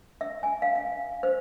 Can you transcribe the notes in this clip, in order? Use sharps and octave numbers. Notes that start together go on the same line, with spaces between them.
E5
G#5
F5
F5
C5